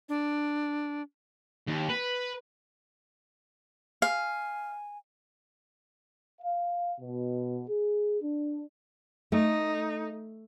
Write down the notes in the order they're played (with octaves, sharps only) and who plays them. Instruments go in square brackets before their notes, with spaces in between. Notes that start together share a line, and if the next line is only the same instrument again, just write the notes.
[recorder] D4
[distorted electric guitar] D#2
B4
[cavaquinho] F5 [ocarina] G#5
[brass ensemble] F5
B2
G#4
D4
[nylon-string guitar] A3 [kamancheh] D#4